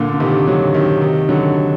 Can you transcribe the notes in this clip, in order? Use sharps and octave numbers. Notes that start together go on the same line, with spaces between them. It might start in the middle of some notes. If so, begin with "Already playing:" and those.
Already playing: A#2 D3
D3
C3 D#3
D3 F#3
C3 D#3
C3 D#3
D3 F#3